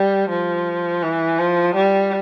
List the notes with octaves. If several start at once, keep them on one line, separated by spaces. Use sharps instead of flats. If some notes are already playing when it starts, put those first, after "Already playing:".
Already playing: G3
F3
E3
F3
G3